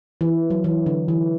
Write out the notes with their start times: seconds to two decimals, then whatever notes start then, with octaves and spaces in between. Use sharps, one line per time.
0.21 E3
0.50 F#3
0.64 E3
0.86 D3
1.08 E3